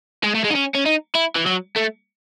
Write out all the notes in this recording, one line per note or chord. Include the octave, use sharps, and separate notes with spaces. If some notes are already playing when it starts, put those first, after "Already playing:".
G#3
A3
G#3
D#4
C#4
C#4
D#4
E4
E3
F#3
A3